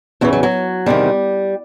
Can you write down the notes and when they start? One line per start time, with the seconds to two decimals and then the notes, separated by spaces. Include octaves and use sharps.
0.21 E2 C#3 E3 F#3
0.33 F#3
0.43 F#3
0.86 E2 C3 D#3 G3